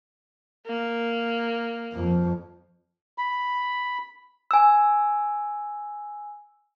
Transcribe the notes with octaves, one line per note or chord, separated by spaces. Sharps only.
A#3
F2 F3
B5
G#5 E6